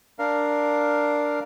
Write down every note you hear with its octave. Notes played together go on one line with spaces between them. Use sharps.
D4 A#4 F5